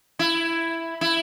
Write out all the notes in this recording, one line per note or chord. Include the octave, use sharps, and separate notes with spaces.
E4
E4